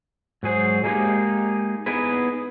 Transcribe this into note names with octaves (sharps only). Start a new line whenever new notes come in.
G#2 F#3 G#4 C5
G#3 A#3 D#4 G4 G#4
B3 D#4 E4 G#4 B4